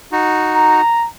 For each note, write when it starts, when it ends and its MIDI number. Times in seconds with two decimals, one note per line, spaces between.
0.12 0.81 63
0.12 0.81 66
0.56 1.07 82